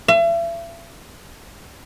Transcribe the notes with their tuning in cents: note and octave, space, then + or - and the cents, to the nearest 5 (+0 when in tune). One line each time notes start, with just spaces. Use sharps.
E5 +40